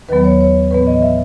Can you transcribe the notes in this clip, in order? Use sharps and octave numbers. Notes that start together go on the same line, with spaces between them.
D#2 D#3 F#3 B3 B4
C#5
C#5
A2 E3 B3 B4
D#5
E5